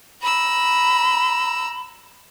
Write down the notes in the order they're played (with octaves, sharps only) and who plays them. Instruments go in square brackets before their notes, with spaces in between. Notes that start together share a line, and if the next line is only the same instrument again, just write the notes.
[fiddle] A#5 E6 [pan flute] B5